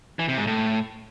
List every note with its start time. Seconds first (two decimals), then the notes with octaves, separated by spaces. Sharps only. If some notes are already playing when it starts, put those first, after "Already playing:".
0.19 E3
0.28 C3
0.38 G#2
0.47 A2